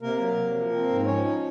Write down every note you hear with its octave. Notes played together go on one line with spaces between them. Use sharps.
C3 A#3 A#4
F#3
C3
F3
C4
G#2
F3 C#4 C#5
D#4